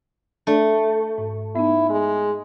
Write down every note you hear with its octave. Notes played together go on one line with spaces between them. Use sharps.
A3 D4 D5
G#2
B3 D#4 E4
G#3